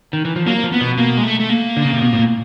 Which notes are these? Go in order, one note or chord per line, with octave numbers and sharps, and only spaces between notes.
D#3
E3
F3
F#3 A#3
F3
B3
B2
A#3
G#3
A3
A3
A#3
D3
C#3
C3
B2
A2
A#2